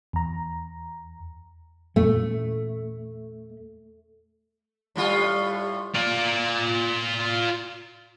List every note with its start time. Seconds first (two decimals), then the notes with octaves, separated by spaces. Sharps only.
0.13 E2 A#5
1.96 E2 A#2 A3 C#4
4.96 A2 G3 F4
5.95 F4 D5